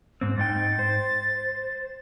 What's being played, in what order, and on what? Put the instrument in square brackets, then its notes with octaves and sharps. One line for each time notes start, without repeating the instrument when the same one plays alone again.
[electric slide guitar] G#2 C4
[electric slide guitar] G#2 D#4 G5 [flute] A6
[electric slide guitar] C5